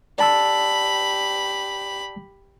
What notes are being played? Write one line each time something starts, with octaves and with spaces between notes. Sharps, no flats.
G4 D5 A5 B5 E6